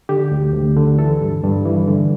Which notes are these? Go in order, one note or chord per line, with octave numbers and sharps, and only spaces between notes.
D3 G4
D2
D2
D3
E3 A4
G2
G2
E3
D3